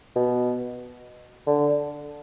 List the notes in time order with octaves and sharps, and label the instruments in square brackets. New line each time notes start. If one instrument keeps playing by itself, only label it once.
[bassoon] B2
D3